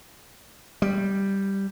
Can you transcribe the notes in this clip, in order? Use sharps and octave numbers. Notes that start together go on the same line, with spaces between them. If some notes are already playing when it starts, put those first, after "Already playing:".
G3